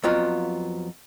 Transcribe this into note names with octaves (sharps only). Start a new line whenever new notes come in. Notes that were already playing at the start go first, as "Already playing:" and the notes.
F2 F#3 B3 F4 A#5